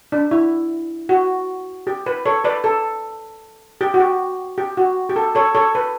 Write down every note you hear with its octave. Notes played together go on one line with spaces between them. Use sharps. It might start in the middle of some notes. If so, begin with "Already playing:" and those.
D4
E4
F#4
G4
B4
A4 C#5
B4 D5
A4
G4
F#4
G4
G4
F#4
G4
A4
A4 C#5
A4 C#5
B4